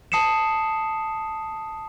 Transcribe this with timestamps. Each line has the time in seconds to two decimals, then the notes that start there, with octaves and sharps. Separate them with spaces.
0.12 A5 D#6 C7 C#7 E7